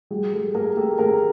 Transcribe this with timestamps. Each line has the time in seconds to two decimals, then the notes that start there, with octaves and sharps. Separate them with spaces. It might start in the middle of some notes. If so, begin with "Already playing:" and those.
0.11 G3 F#4 G#4
0.33 G3 G4 A4
0.55 A#3 G#4 A#4
0.77 A#3 G4 A4
0.99 A#3 G#4 A#4